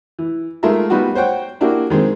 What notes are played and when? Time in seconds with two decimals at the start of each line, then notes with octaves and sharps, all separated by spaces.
0.19 E3
0.63 G#3 A3 D#4 F4 A#4 E5
0.90 G3 B3 D#4 F4 F#4
1.15 C5 C#5 F#5 G5
1.61 A#3 D4 E4 F#4 G4
1.90 D#3 G#3 C4